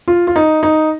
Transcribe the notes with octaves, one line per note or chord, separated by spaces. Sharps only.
F4
F4
D#4
D#4